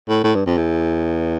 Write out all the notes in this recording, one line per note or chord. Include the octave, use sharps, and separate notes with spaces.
A2
A2
G2
F2
E2